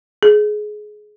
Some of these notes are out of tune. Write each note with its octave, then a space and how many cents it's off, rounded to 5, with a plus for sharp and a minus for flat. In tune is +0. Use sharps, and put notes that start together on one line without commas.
G#4 +20